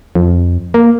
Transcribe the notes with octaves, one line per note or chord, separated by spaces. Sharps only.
F2
A#3